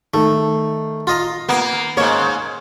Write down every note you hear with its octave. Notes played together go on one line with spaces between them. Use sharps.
D#3 A3
F4 D#5 A#5
A#3 B3
G#2 A#3 C#5